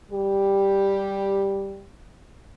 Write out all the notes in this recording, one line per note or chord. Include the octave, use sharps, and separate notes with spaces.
G3 G4